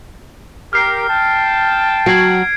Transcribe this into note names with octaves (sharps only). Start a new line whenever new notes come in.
G4 A#4 F6 C7
G5 A5
F#3 F#4 G#6 C7 D7